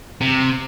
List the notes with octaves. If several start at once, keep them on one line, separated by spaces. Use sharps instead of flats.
C3